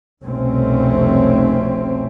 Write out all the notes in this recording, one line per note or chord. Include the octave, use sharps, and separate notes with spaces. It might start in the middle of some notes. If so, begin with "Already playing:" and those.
F1 C2 B2 A3 C4 C#4